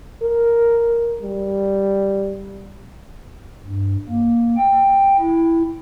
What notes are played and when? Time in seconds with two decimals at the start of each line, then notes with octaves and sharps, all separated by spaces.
0.23 A#4
1.23 G3
3.66 G2
4.09 A#3
4.58 G5
5.19 E4